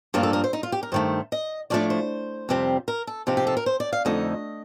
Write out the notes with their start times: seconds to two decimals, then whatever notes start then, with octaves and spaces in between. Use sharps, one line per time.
0.14 G2 F3 A#3 D4 F4
0.23 A4
0.33 A#4
0.44 C5
0.53 D#4
0.63 F4
0.72 G4
0.83 A#4
0.92 G2 D#3 A3 C5
1.32 D#5
1.70 A2 F3 A3 D4 D5
1.90 C5
2.49 F2 C3 G3 C4
2.88 A#4
3.07 A4
3.27 C3 F3 C4 D#4 G4
3.37 G4
3.47 A4
3.57 A#4
3.66 C5
3.80 D5
3.93 F5
4.05 F2 D3 A3 D#4 D#5